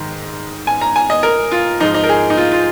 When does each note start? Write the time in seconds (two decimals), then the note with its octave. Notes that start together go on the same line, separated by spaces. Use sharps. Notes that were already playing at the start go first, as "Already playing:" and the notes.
Already playing: G#2 D#3
0.67 G#5
0.81 A#5
0.96 G#5
1.10 D#5
1.23 A#4
1.52 F4
1.80 G#2 F3 D#4
1.94 D#4
2.04 A#4
2.09 G#4
2.30 D#4
2.37 F4
2.52 F4